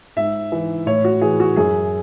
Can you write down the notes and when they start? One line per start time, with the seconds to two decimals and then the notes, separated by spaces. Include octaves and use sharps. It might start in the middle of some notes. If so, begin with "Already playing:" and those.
0.16 G#2 E5
0.52 E3
0.86 A2 C#5
1.04 F#4
1.21 E3 G#4
1.40 F#4
1.56 F#2 G#4